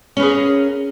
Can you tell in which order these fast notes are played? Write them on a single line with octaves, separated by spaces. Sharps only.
C#4 B4 G#4 F5 A#4